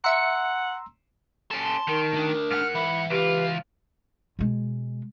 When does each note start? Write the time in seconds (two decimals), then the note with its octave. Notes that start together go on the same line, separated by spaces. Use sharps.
0.04 E5 F#5 A#5 C6 E6 C#7
1.51 C#4 A4 A5 C6
1.87 D#3 A#4
2.13 D2 D4
2.51 G#2 F#5 F6
2.75 E3 B5
3.10 C#2 F4 G4 B4
4.39 B2 G#3